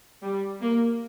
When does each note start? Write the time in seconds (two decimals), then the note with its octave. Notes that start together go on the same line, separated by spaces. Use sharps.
0.23 G3
0.61 A#3